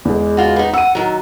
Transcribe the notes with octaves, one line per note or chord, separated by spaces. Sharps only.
E2 G#3
C#3 F4 F#4
B3 D#4
F#5 E6 D#7
D#3 F#3